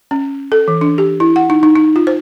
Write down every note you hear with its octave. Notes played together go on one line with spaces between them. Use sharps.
C#4
A4
E3
D4
G4
E4
F#5
D#4
D#4
D#4
F4
C5